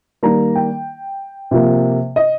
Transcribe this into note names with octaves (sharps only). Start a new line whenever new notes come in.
D#3 G3 A#3 A#5
G5
C3 F3 A#3
D#5